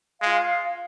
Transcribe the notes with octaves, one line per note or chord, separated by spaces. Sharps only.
G#3 F4 F5